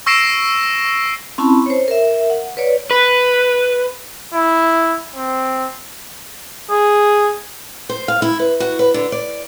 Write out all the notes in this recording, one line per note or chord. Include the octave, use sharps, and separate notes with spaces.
C#6 E6 A#6 C7 D7 E7
C4 C#4 E4 A5 B5 C6
C5 C#5
A#4 E5
F#5
B4 C#5 D5
B4
E4
C4
G#4
C5
F5
E4
B4
F#4
B4
D3
D5